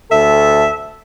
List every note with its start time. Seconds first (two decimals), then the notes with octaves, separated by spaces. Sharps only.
0.11 D2 A4 E5